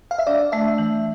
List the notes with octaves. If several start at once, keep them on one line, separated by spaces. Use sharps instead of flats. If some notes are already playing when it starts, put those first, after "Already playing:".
F5
E5
D4 D5
A3 E5
E3